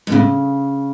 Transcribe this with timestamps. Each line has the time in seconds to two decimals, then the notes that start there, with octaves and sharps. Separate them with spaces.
0.07 G#2
0.11 A2 C#3